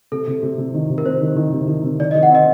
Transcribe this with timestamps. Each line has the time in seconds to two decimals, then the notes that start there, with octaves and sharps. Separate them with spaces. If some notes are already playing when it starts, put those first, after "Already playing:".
0.12 C3 A4
0.27 C3
0.43 C3
0.58 C3
0.74 D#3
0.90 C3
0.98 A#4
1.05 C3 C5
1.21 D#3
1.36 D#3
1.52 C3
1.68 D#3
1.83 C3
1.99 D#3 D5
2.11 D#5
2.15 D#3
2.23 F#5
2.30 C4 D#5